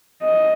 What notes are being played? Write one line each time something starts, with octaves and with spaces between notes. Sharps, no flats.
D#5